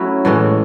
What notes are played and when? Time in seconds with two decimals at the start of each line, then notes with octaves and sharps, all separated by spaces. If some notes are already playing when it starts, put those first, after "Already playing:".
Already playing: F#3 A3 C#4 E4
0.25 A2 E3 G#3 C#4